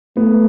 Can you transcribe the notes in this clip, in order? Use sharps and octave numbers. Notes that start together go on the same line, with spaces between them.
A3 B3